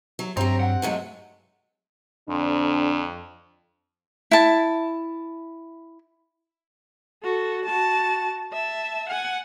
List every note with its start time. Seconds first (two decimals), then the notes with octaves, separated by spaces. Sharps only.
0.19 F#3
0.37 G2 F#3 G3 C4 A#5
0.60 F#5
0.82 A2 F#3 G#3
2.29 F2 D3 C4 D4
4.31 E4 A5
7.24 F#4 A4
7.65 F#4 A5
8.53 E5 A5
9.09 F#5 G#5